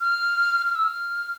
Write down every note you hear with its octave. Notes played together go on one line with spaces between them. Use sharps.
F6
F6
E6
F6